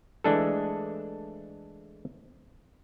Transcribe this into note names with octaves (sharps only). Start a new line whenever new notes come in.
E3 G#3 A3 D4 G#4 A4